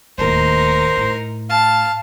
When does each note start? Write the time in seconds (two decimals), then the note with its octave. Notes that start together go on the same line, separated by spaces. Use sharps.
0.18 D1 D#2 D#4 A#4 C5
0.97 A2
1.49 F5 A5